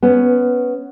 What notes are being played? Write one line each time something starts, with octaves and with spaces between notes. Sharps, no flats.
B3 C#4